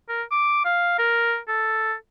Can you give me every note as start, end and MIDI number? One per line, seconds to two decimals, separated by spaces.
0.09 0.23 70
0.31 0.62 86
0.65 0.97 77
0.99 1.37 70
1.48 1.93 69